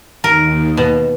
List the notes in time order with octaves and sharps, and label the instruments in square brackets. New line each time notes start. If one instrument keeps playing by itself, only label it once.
[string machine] D#2 [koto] A#4
[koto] B2